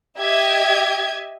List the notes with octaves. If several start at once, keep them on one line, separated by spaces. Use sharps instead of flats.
G4 D#5 E5 G#6